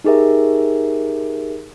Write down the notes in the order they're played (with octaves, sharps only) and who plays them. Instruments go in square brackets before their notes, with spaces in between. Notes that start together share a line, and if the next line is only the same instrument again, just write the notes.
[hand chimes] D#4 G4 G#4 A#4 E5